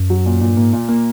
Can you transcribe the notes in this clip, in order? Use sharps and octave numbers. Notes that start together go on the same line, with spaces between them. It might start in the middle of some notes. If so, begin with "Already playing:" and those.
Already playing: F#2
F#3
A#2
G2 A#2
G#2 A#3
A#2
A#3